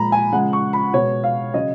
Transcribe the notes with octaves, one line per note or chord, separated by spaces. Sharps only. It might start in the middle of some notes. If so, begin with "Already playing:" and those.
Already playing: A#2 F3 G#3 A#5 B5
G#5
C#3 F3 G#3 F#5
C#6
B5
B2 G#3 C#5
F5
C#3 F#3 D#5